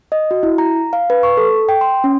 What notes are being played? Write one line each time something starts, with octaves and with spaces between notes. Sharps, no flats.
D#5
F#4
E4
A#5
F5
B4
C#6
A4
G5
C6
C#4